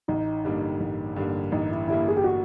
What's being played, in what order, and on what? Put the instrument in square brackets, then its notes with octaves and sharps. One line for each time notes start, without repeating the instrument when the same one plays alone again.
[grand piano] A1 [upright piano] D#4
[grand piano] G2 D3 G3 A#3
A1
G2 D3 G3 A#3
[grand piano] A1 [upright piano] D#4
[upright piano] E4
[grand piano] G2 D3 G3 A#3 [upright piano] E4
[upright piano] G#4
G4
F#4